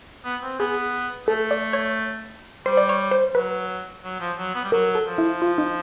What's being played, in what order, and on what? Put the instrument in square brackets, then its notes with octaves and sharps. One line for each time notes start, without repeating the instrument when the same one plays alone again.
[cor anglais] B3
C4
[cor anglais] B3 [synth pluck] G#4
[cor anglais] A3 [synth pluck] A4
[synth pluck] D5
C#5
[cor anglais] G3 [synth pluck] C5
[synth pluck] D5
C#5
C5
[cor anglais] F#3 [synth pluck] B4
[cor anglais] F#3
F3
F#3
B3
G3
[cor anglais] F#3 [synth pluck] A#4
[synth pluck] A4
[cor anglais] F3
[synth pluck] E4
F4
D#4